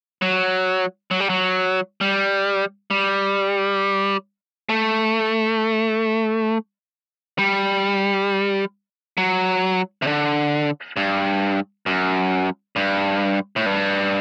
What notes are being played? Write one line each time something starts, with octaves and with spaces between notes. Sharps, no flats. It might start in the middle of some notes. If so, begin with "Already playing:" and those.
F#3
F#3
G3
F#3
G3
G3
A3
G3
F#3
C3
D3
G2
F#2
G2
A2
G2